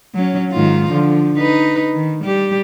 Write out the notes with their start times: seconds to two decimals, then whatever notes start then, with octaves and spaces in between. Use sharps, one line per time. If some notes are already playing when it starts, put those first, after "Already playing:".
0.15 F#3 C#4
0.51 G#2 D#3 F4
0.91 D3 F3
1.38 D#4 B4
1.94 D#3
2.24 G3 G4